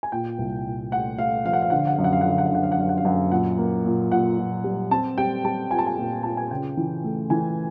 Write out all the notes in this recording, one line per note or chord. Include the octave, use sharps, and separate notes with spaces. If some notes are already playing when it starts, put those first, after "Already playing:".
G#5
A#2 G5
C2
A#2
A3 F#5
A3 F5
F3 F5
F#5
F5
D3 F#5
F5
F#5
F#2 F5
F#5
F5
F#5
D3
F5
F#5
F5
D3 F#5
F5
F#5
F#2 F5
F#5
F5
F#2 F#5
F5
A#2 F#5
A#3
A#2
A#2 F#5
A#2
G3
C4 A5
G3 G5
G3 A5
F4 G#5
A5
G#5
A#2
F4 A5
G#5
C#3 G5
E3
A3
E3 G#5